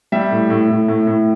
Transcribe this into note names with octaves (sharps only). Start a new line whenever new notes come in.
G3 E5
A2
A2
A2
A2
A2